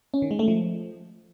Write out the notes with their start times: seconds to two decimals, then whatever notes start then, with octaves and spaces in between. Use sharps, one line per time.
0.14 C#4
0.22 D#3
0.31 G#3
0.39 A3
0.48 F3